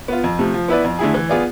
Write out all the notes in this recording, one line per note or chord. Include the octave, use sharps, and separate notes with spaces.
B3 F4
F2
C3 F3 A3
F3
B3 E4 B4 D5
F2
D3 A3 E4 G#4
E3
B3 F4 G#4 D5